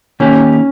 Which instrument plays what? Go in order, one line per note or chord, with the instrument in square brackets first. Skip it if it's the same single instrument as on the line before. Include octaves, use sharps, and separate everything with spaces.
[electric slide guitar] D#3 A#3 D#4 G4 [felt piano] C#4